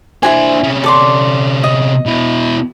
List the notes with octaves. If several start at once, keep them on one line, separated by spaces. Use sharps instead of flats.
D4 E4 F#4 C5 G#5
C3 C#4
A4 D5 C6
D#5
B2 E4